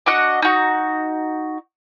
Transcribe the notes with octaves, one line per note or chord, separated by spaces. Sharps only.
D4 F#4 D#5 F#5
D#4 F#4